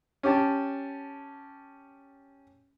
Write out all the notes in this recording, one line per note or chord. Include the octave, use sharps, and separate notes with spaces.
C#4 G4 G5 A5